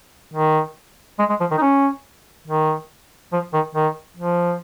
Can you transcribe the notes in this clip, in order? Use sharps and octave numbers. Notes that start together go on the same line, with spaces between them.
D#3
G#3
G#3
F3
D#3
D#4
C#4
D#3
F3
D#3
D#3
F3